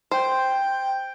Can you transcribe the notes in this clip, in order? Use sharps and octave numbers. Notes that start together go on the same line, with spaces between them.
C5 G5